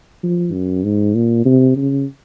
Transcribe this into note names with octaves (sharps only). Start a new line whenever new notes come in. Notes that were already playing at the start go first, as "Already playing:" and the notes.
F3
F#2
G#2
A#2
C3
C#3